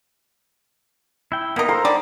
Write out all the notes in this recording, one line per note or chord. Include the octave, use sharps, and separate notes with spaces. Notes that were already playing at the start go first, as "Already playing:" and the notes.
E4 G5
A#3 B3 D#4 A#4 D#6
A4 C5 F5 A#5 C6
D3 G3 D#4 D5